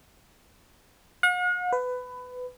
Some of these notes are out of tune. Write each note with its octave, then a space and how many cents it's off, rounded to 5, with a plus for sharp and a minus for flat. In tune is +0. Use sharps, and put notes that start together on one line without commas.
F#5 -45
B4 +20